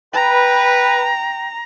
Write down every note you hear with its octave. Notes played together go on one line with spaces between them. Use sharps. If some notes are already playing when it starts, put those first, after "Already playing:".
B4 G5 A#5